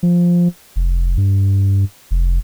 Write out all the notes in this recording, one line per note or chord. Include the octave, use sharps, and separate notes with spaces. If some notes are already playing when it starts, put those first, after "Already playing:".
F3
F1
G2
F1